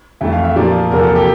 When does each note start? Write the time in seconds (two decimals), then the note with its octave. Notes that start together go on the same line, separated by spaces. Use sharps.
0.21 F2 E3 A3 E5
0.32 F5
0.44 E5
0.56 A#2 F3 A#3 D5
0.91 E2 C3 F3 A#3 A#4
1.03 A4
1.15 G4